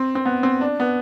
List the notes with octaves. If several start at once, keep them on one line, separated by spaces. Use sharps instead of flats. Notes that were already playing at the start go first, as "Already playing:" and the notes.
Already playing: C4
C4
B3
C4
D4
B3